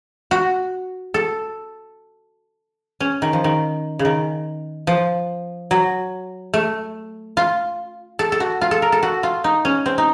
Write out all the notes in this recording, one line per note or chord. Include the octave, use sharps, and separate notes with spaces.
F#4
A4
C#4
D#3
F3
D#3
C#3
D#3
F3
F#3
A3
F4
A4
A4
F#4
F4
A4
A#4
A4
F#4
F4
D#4
C#4
C4
D#4